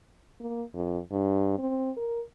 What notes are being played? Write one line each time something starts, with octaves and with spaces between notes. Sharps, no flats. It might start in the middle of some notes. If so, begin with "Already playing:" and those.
A#3
F2
G2
C4
A#4